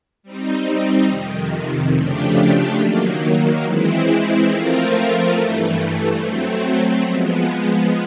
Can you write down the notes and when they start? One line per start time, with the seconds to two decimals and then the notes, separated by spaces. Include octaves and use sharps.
0.23 G3 C4 D#4
1.08 F2 C3 D#3
1.93 C#3 F3 A3 D4 G4
2.78 D#3 F#3 A#3
3.63 E3 G#3 C4 E4
4.48 F3 A3 C4 F4 A#4
5.33 G2 E3 A3
6.17 F#3 A3 C4
7.03 F3 G#3 B3